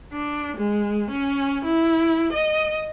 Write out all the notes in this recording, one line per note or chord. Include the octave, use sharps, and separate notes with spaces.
D4
G#3
C#4
E4
D#5